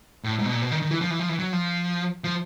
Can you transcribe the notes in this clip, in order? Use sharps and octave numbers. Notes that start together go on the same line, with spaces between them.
A2
G#2
B2
A#2
B2
D#3
D#3
E3
F3
E3
F3
E3
F#3
F3
F3